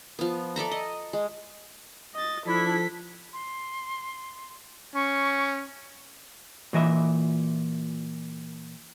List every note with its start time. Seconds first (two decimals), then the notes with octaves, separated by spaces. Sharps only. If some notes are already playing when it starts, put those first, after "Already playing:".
0.19 F3 B3
0.56 A4 D5 E5 A#5
0.71 D#5
1.13 G#3
2.15 D#5 A6
2.46 F3 D4 E4 A4 B6
3.33 C6
4.95 C#4 C#6
6.73 A#2 E3 D#5 E5